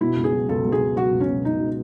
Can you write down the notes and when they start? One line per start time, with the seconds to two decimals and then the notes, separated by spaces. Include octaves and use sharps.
0.01 B2 E4
0.16 C#2
0.24 G#4
0.32 F#3
0.49 C#2 A4
0.65 B2
0.72 G#4
0.80 C#2
0.96 F#3 F#4
1.12 C#2
1.20 C#4
1.29 B2
1.45 C#2 D#4
1.60 F#3